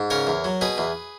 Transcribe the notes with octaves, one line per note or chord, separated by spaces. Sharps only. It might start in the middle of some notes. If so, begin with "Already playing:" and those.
Already playing: G#2
C#3 A#4 C#5
E2
F#3
B2 G#4 B4
E2